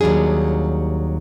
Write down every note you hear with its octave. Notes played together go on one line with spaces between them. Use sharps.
D#2 F#3 G3 D4 G#4